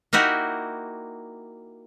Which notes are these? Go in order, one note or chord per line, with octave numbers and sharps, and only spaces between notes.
A#3 D#4 E4 F#4 G4